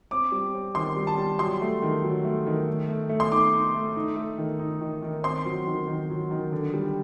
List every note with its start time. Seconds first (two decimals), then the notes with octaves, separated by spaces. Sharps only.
0.11 C4 D6
0.32 G3
0.54 C4
0.75 D#3 C6
0.96 G3
1.07 A5
1.18 G3
1.39 F#3 C6
1.61 A3
1.82 D#3
2.04 F#3
2.24 A3
2.46 D#3
2.67 A3
2.88 A3
3.09 A3
3.20 C6
3.31 D#4 D6
3.53 D#4
3.74 A3
3.96 D#4
4.16 A3
4.38 D#3
4.59 D#4
4.81 D#3
5.02 D#3
5.23 C4 C6
5.45 F#3
5.66 D#3
5.87 D#3
6.09 F#3
6.31 D#3
6.52 D3
6.74 G3